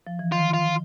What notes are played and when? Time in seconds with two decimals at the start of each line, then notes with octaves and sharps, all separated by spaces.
0.07 F3
0.19 E3
0.32 D#3 F4
0.54 F4